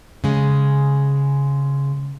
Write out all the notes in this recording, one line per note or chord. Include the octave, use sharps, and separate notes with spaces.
C#3 G#3